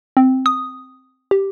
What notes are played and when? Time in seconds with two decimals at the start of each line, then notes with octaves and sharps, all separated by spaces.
0.17 C4
0.46 D#6
1.31 G4